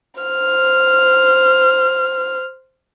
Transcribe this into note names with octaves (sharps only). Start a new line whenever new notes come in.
C5 F6